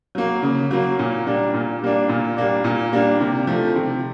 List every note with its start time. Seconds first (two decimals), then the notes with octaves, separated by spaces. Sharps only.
0.15 F#3 A#3
0.42 C#3
0.71 F#3 A#3
0.99 A#2
1.26 G3 A#3 D4
1.54 A#2
1.82 G3 A#3 D4
2.09 A#2
2.37 G3 A#3 D4
2.64 A#2
2.92 G3 A#3 D4
3.20 C3
3.47 F3 A3
3.75 C3